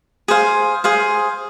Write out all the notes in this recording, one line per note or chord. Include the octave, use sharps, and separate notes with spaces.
G#4 C5 F5
G#4 C5 F5